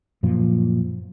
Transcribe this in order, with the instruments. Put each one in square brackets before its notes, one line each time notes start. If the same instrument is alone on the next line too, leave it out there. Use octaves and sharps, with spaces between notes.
[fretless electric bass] F#2 A#2 F3